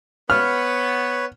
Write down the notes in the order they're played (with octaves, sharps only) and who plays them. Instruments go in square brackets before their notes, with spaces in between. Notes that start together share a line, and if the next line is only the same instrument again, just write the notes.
[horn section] B3 [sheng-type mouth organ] B4 C#5 [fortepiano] F6